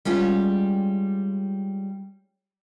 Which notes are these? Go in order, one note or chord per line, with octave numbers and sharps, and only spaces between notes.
G3 G#3 C#4 F4